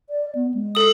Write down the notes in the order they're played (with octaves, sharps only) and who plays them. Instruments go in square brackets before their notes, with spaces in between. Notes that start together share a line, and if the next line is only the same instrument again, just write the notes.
[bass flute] D5
B3
G#3
[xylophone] A4 D#6